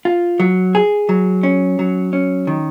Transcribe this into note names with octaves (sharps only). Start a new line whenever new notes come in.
F4
F#3
G#4
F#3
C#4
F#3
C#4
D#3